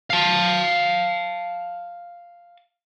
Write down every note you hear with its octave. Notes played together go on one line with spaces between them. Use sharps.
F5 A5